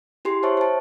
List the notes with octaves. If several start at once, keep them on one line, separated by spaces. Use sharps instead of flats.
E4 G4 G#4 C6
C5 C#5 E5 A5 C#6
C5 A5